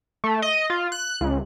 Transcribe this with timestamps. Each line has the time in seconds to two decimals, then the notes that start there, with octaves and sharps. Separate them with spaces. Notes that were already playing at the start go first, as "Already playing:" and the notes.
0.24 A3
0.42 D#5
0.70 F4
0.92 F#6
1.21 C#2